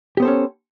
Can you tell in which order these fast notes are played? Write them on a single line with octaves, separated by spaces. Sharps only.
G4 B3 C5 A4 C#4